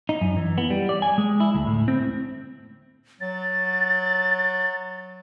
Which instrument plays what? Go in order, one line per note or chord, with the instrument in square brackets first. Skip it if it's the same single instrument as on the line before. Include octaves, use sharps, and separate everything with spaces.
[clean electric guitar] D#4
F#2
E3
B3
G3
D5
G#5
G#3
E4
D2
A2
C4
[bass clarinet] F#3 [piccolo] A6